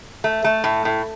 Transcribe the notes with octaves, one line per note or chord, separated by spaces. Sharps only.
A3
A3
A2
A2